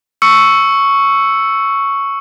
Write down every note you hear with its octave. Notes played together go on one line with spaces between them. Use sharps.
C#6 E6 C#7